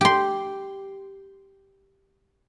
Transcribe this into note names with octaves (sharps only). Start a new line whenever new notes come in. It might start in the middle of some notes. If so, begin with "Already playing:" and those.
G4 C6